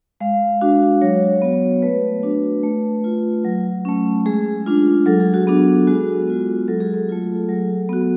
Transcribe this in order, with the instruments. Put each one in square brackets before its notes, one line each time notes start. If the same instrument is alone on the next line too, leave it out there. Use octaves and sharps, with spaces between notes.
[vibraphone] G#3 F5
D4 F#4
F#3 C#5
B3 F#4
A3 B4
D4 F#4
A3
F4
F#3
A3 C#4
G#3 G#4
D4 F4
F#3 A4
G#4
F#4
B3 D4 G#4
G#3 F#4
B3 F4
F#3 A4
G#4
A4
A3 F4
F#3
B3 F#4